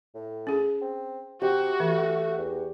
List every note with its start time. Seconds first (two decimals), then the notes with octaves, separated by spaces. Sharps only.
0.15 A2
0.47 C#4 G#4
0.81 C4
1.42 C3 F#4 G4
1.80 E3 A3
2.38 E2